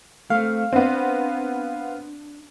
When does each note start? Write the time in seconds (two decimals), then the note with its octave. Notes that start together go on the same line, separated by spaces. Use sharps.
0.30 A3 C4 F5
0.73 B3 C4 D4